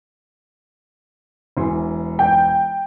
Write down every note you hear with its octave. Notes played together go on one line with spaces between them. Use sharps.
E1 E3 C6
G5